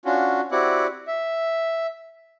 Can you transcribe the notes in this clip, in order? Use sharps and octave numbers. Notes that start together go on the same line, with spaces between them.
C#4 D4 F4 F#4
C4 E4 F#4 G4 D5 F#5
E5